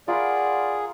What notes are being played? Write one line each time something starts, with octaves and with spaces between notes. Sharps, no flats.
F4 G#4 A#4 D5 F#5 B5